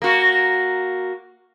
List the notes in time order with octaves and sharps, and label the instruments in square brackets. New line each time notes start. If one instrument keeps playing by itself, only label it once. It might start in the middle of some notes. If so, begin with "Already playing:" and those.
[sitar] A#3 F#4